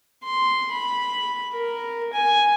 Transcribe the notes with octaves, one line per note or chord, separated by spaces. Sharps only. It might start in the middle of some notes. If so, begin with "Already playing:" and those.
C6
B5
A#4
G#5